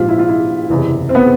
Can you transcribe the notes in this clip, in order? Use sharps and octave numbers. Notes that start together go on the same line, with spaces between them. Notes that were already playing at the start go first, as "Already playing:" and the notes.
Already playing: A#1 G#2 F3 F4 G4
E4
F4
E4
F#1 E2 C3
C4
B3